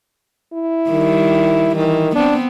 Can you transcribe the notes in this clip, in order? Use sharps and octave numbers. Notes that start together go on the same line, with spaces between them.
E4
D#3 G3
D#3 E3
B3 C4 D4